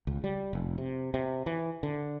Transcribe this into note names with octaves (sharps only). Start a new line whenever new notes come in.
C#2
G3
F1
C3
C3
E3
D3